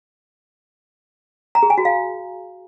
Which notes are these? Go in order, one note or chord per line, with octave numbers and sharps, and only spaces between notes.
A#5
G#4
G#5
F#4
F5